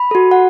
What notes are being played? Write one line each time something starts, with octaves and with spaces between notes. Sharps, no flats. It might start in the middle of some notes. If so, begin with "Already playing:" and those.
Already playing: B5
F#4 A4
F#5